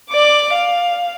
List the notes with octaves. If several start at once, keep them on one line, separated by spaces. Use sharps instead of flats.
D5 D6
F5